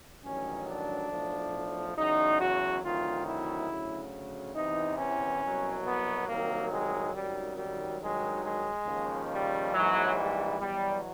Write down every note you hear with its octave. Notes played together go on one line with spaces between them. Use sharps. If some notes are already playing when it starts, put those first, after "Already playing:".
A1 G2 D#3 F#3 C#4
D4
B1 A2 F3
E2 C#3 F#3 D#4
F#4
D2 C3 D#3 F#3 F4
E4
D2 C#3 F#3
E2 C3 E3 D#4
C#4
C2 B2 F#3
B3
C2 C3 D#3 F#3 A#3
G#3
G#1 F#2 D#3 F#3 G3
G3
G#1 G2 D#3 F#3 G#3
G#3
D#2 C#3 F3
G3
A#1 G#2 E3 F#3
G3
E2 B2 F#3 G3